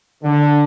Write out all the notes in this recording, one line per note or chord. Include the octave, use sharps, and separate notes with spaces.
D3